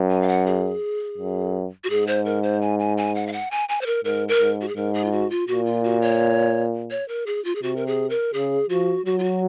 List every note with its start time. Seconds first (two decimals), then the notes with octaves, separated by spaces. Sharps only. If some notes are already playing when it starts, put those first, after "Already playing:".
Already playing: F#2
0.10 G#5
0.22 F5
0.28 F#5
0.47 G#4
1.18 F#2
1.84 F#4
1.90 G#2 G#4
2.07 C5
2.25 A#4
2.43 C5
2.62 G#5
2.79 G#5
2.97 G#5
3.15 F#5
3.27 F5
3.33 F#5
3.51 G#5
3.69 G#5
3.81 C5
3.86 A#4
4.04 G#2 A#4
4.28 A#4
4.40 G#2
4.61 F#4
4.68 G#4
4.76 G#2 A#4
4.94 G#4
5.04 F4
5.12 F#4
5.30 F4
5.48 A#2 F#4
5.65 F4
5.84 F#4
6.02 C#5
6.91 C#5
7.08 A#4
7.27 G#4
7.44 F4
7.55 G#4
7.62 C3 F#4
7.76 A#4
7.87 G#4
8.10 A#4
8.34 C#3 G#4
8.70 F3 F#4
9.06 F#3 F#4
9.19 F4
9.23 F#4